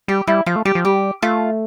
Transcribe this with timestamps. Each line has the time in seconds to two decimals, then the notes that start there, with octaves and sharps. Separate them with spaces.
0.08 G3 G4
0.27 G3 E4
0.46 F3 F4
0.56 A3
0.65 G3 G4
0.75 F3
0.85 G3 G4
1.22 A3 F4